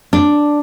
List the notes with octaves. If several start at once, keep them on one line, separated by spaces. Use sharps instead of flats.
D4